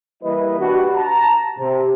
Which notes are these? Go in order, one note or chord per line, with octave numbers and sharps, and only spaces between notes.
E3 G3 A#3 E4 B4 D#5
D4 F#4 G4 B4
A5 A#5
C3